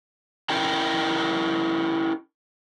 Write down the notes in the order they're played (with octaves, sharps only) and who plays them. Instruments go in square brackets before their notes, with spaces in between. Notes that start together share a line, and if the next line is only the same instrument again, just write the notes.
[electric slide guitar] C#4 E4 A#4 D#5 G5 A#5